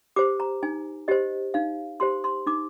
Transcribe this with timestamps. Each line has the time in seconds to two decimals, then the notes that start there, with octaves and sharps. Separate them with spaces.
0.16 G4 C5 D6
0.40 A#5
0.63 D#4 G#5
1.08 G4 C5 D#5
1.54 D#4 F5
2.00 G4 C5 C6
2.24 C6
2.47 D#4 D6